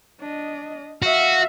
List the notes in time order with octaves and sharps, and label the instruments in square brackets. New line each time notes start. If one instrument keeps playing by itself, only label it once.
[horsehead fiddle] D4 D#5
[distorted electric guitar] F#4 [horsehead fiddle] E5 F5